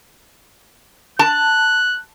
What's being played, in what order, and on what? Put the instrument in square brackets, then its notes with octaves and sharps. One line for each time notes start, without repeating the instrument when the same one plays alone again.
[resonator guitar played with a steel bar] A5 [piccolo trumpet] F#6